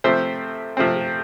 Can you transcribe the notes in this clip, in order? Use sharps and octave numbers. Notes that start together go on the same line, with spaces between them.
C3 F3 A3 C4 C5 E5
C3 F3 A3 C4